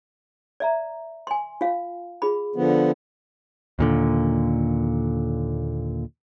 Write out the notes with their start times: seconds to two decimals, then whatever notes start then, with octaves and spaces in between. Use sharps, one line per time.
0.60 D5 E5 A#5
1.27 G#5 C6
1.61 F4 F5
2.22 F4 G#4 B5
2.56 D3 F3 B3
3.79 D#2 A#2 D3